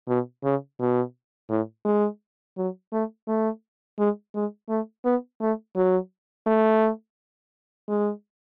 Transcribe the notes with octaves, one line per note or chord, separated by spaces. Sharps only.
B2
C#3
B2
A2
G#3
F#3
A3
A3
G#3
G#3
A3
B3
A3
F#3
A3
G#3